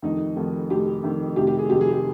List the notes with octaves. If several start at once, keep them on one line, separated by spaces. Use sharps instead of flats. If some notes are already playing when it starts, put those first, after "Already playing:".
F1 F2 D#3 D#4
F1 F2 D#3
F1 F2 D#3 G4
F1 F2 D#3
F1 F2 C3 D#3 G4
G4
G#4
F1 F2 C3 D#3 G4
G#4
G4